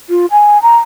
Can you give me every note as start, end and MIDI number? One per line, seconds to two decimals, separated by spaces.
0.09 0.26 65
0.31 0.61 80
0.62 0.77 82